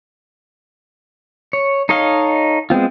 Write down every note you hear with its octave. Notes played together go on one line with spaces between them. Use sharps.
C#5
D#4 A4 C#5 D#5 F5
G#3 B3 C4 F4